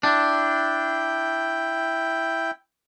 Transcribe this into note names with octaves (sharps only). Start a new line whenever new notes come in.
D4 E4 G5